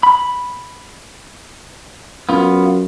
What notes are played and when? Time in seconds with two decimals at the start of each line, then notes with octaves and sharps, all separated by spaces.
0.03 B5
2.29 F#2 B3 F4